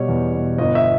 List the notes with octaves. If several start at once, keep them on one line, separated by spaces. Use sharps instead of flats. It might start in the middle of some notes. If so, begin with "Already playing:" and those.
Already playing: B2 G3 C#5
E2
B2
G1 D#5
E5